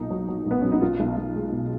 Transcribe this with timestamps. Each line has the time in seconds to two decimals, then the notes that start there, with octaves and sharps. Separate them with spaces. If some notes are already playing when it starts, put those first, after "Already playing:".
Already playing: B1 A#2 D#4
0.10 F#3
0.28 F#3
0.46 B1 B3
0.61 F#3 C#4
0.72 D#4
0.82 B1 F4
1.00 B1
1.17 B1
1.36 G#3
1.52 B2